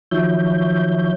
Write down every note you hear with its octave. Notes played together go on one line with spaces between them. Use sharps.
D#3 F3 F#3 C#5 E5 G6